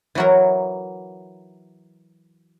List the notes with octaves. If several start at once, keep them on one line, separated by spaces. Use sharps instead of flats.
E3 F#3 A#4